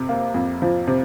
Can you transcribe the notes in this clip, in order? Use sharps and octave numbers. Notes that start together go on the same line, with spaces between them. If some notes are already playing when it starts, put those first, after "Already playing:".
Already playing: F2 C3
A#3
F2
F3
C3